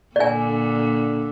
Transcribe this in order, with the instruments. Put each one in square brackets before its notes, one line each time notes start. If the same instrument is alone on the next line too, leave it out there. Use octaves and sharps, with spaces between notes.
[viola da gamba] A#2 D3 [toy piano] D5 G#5